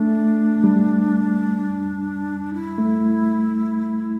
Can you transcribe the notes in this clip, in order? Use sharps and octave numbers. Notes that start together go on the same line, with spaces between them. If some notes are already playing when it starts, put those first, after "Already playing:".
Already playing: A3 D4
G3
E4
A3